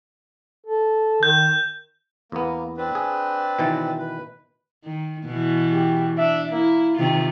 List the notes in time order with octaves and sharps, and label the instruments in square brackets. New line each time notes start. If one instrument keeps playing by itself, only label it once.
[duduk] A4
[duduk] D#3 [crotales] G6
[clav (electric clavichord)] E2 B3 [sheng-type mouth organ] A#3
[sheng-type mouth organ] C4 D4 B4
[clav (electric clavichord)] G#4
B2 D#3 E3
[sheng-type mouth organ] B4
[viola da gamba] D#3
B2 E3
[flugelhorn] G4
[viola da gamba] D4 [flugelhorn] E5
[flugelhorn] A#3 [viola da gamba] E4
[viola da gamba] C3 D#3 F4